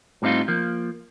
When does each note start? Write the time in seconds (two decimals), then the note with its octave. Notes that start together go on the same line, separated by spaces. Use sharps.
0.22 A2 G3 C4 D#4 F4
0.48 F3 A#3